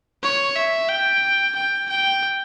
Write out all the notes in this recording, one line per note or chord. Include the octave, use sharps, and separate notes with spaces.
C#5
E5
G5
G5
G5